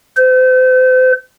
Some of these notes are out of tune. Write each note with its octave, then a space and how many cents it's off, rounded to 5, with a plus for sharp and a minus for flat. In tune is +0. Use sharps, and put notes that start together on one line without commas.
C5 -35